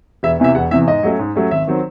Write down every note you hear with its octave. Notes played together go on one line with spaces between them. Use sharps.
E1 E5
E2 C3 E3 E5
E1 F#5
E2 C3 E3 E5
G#2 D#5
F#3 A3 C#4
G#2
F#3 A3 C#4
G#1 E5
D#3 F#3 C4